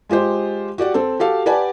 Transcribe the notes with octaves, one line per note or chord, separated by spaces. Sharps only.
G#3 F4 G4 C5
F#4 G4 D5 F#5
C4 A4
F#4 G4 A4 F5
G4 B4 D5 F#5 G#5 A5